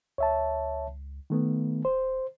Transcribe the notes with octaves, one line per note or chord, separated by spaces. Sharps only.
C#2 C#5 E5 A5
D#3 A3 B3
D1 C5